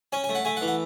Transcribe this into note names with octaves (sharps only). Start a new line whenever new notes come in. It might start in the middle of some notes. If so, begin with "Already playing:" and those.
C#4 G#5
G#5
A3
F#5
A3 G#5
F#5
E3
F#5